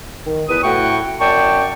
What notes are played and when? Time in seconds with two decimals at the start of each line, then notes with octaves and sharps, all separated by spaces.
0.25 D#3
0.49 E2 B4 D#6
0.64 A2 A3 F#4 F#5 G5 C#6
1.20 F#2 D5 G5 A5 C#6